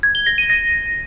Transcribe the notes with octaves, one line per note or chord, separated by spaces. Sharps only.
G#6
G7
A#6
D#7
A#6